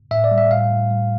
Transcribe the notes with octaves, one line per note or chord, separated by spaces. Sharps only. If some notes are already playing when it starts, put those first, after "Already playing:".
A2 E5
D5
G3
E5
A2 F5
A2
G3